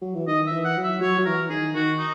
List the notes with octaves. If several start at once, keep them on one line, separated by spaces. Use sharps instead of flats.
F#3
E3
D#3 D#5
E5
E3
F#5
F#3
E5
F#3 C#5
F#3
E3 A#4
D#3 G#4
D#3 F#4
D#4